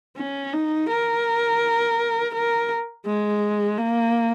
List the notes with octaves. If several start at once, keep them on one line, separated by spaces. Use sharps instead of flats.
C#4
D#4
A#4
A#4
G#3
A#3